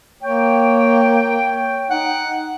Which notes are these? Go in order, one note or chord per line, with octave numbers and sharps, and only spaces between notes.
A#3 C#5 G5
D#4 F#5